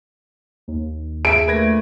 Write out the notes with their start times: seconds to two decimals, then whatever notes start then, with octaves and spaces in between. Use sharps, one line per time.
0.68 D#2
1.25 G#4 E5 D7
1.48 A#2 D3 A3 B4 G#6 A#6